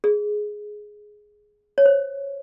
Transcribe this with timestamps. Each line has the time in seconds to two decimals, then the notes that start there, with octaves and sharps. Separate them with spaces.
0.04 G#4
1.78 C#5
1.86 C5